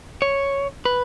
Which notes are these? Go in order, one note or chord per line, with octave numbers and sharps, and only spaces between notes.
C#5
B4